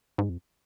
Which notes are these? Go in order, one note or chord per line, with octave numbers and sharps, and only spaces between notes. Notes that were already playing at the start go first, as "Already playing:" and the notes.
G#2
F2